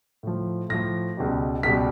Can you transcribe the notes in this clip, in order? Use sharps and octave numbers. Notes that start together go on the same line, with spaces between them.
A2 F3
A2 F3 A#6
C#2 B2 G3
C#2 B2 G3 B6